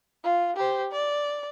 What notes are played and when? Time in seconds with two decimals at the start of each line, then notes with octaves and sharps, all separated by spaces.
0.24 F4
0.56 G4 C5
0.92 D5